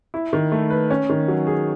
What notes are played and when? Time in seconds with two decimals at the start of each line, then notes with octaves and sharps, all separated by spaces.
0.14 E4
0.33 D#3
0.52 A3
0.70 B4
0.90 C#4
1.09 D#3
1.28 F#3
1.47 G#4